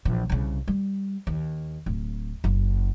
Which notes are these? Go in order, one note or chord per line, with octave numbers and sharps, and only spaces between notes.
A#1 E3
C2 C#3
G3
D#2
D1
F#1